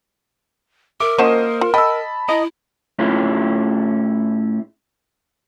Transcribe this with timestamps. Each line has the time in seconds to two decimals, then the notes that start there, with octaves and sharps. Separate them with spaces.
1.00 A#4 E5 D6
1.18 F3 A#3 C#4 F#4 C5 D#5 E7
1.61 F4
1.74 D#5 G5 A5 B5 E6
2.29 E4 D#5 A#5 D#6
2.99 A2 A3 C#4 E4 F4 G#4